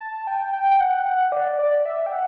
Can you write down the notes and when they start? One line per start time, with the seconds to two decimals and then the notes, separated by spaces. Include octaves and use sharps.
0.01 A5
0.27 G5
0.53 G5
0.71 G5
0.80 F#5
1.06 F#5
1.32 D5
1.59 D5
1.85 E5
2.06 G5
2.12 F#5